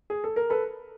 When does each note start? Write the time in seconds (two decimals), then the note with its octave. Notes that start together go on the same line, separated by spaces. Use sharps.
0.10 G#4
0.24 A4
0.36 A#4
0.50 A4 B4